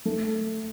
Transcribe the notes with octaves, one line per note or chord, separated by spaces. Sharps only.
A3 A4